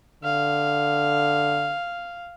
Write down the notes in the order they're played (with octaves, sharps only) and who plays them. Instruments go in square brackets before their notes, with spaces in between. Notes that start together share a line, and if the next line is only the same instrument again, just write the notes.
[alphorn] D3 [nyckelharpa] F5